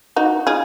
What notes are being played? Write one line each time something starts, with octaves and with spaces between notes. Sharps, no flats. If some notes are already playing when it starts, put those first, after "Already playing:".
D#4 F#4
F4 G#4